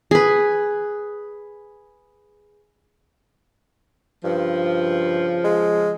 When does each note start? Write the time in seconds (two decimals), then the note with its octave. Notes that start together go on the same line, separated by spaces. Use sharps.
0.11 G#4 B4
4.25 G2 C#3 F3
5.45 G#3